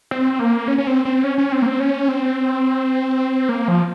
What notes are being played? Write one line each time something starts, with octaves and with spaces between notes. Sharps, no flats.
C4
A#3
C#4
C#4
C4
C4
C#4
C#4
C4
A#3
C4
C#4
C4
A#3
F3